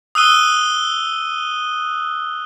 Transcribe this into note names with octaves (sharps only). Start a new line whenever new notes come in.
D#6 E6 F#6 D#7 G7